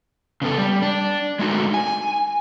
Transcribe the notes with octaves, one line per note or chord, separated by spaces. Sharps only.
C#3 B3 A4
G3
D4
G#3 A3 D#4 F#4
G#5